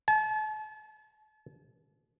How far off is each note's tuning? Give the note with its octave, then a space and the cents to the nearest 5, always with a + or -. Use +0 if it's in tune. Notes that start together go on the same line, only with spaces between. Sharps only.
A5 -40